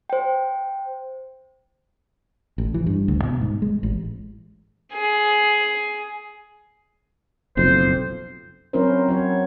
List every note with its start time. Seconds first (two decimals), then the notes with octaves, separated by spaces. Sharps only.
0.10 C5 G5
2.58 A1
2.74 E3
2.86 G2
3.08 D2
3.23 B2
3.41 G#2
3.62 G#3
3.83 A1
4.92 G#4
7.57 F#1 B1 F2 C5
8.73 F#3 C4 C#4 E4 A#4 C5
9.08 F#3 E4 C#5